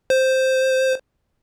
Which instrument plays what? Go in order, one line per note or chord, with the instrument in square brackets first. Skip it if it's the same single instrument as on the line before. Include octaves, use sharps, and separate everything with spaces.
[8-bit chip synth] C5